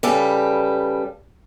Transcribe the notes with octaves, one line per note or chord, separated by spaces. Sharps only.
C#3 G3 A4 B4